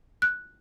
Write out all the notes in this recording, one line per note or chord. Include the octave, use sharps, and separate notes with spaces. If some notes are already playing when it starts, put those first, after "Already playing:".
F#6